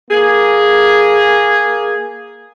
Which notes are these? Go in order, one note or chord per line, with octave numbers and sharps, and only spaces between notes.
A#3 G#4